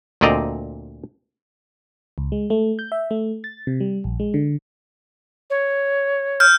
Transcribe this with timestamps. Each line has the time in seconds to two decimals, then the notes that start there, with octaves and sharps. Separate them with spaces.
0.21 D2 A#2 C4 D5 D#5 A#5
2.18 C#2
2.32 G#3
2.50 A3
2.79 G6
2.92 E5
3.11 A3
3.44 A6
3.67 C3
3.80 G3
4.04 A#1
4.20 G#3
4.34 D3
5.50 C#5
6.40 F6 G6